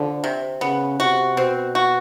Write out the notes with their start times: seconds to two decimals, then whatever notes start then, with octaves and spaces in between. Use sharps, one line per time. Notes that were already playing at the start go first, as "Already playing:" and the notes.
Already playing: D3 F3
0.24 C3
0.61 C#3 B3
0.99 C3 F#4
1.37 B2 C4
1.75 F#4